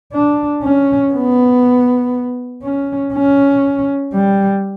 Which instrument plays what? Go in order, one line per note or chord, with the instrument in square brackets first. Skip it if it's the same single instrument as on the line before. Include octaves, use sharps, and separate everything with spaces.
[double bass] D4
C#4
B3
C#4
C#4
G3